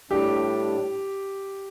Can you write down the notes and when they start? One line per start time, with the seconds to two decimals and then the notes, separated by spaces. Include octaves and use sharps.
0.11 A2 G3 D4 G4